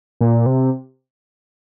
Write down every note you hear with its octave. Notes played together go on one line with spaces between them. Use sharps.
A#2
C3